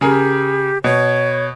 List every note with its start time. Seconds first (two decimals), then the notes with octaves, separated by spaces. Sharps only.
0.01 C#3 G4 G#4 A#4
0.84 B2 C#5